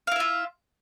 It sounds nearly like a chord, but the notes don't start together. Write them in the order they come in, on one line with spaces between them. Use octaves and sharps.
F5 E4 E5 F4